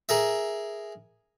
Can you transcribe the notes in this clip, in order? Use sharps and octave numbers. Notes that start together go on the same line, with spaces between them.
G#4 A#4 E5